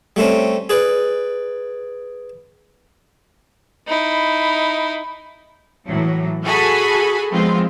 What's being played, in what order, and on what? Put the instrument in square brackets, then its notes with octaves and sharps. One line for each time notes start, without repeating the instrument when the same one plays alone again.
[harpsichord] G3 A3 C4 C#4
G#4 B4 D5
[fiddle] D#4 E4
[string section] A2 E3 F#3
F#4 G#4 A4 G#5 B5 C#6
F3 G#3 B3 C4 F4